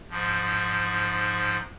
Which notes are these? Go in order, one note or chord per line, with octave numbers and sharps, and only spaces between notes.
G#2 F3